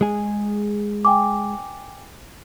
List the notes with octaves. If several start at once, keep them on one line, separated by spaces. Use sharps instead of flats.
G#3 G#4
G5 G#5 D6